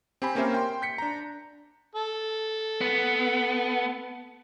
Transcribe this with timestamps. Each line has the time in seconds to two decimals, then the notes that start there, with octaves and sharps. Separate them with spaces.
0.22 C4 G4 G#5 B5
0.35 A#3 C#4 G4 A#4 C5 E5
0.54 G5 C6
0.82 G6 B6 C#7
0.98 D4 A#5
1.95 A4
2.81 B3